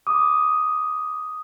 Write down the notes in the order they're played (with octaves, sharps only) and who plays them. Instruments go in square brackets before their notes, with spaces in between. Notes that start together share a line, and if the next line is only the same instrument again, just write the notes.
[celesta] D6 [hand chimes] D#6